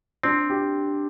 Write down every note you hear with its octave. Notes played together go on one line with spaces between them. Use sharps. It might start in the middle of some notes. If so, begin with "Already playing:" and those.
C4 D4
G4